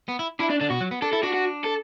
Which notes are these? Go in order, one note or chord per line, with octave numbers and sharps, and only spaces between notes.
B3
E4
D4 E4
D4
D3 D4
B2 F#4
F#3
B3
D4 A4
E4 A4
D4 F#4
F#4
A4